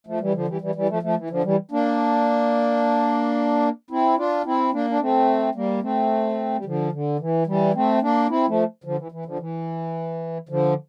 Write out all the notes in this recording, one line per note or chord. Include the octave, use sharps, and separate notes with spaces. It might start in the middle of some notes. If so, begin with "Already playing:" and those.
F3 A3
E3 G3
D3 F3
E3 G3
E3 G3
E3 G3
F3 A3
F3 A3
E3
D3 F3
E3 G3
A#3 D4
C4 E4
D4 F4
C4 E4
A#3 D4
D4
A3 C4
G3 A#3
A3 C4
G3
D3 F3
D3
E3
E3 G3
A3 C4
A#3 D4
C4 E4
F3 A3
D3 F3
E3
E3
D3 F3
E3
D3 F3